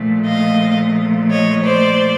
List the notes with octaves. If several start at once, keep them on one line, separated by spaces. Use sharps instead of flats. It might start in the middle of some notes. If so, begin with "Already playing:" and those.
Already playing: A#2 F3 A3
D#5 F5
C#5 D#5
C5 D5